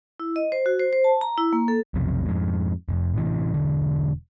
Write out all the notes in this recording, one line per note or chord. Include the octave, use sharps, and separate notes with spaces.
E4
D#5
C5
F#4
C5
C5
A5
A#5
E4
A#3
A4
B1 F2 C3
F2 G#2
F1 F2
A2 C3 E3
E1 B1 D3